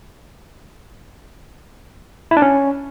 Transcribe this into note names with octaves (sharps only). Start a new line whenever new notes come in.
E4
D4
C#4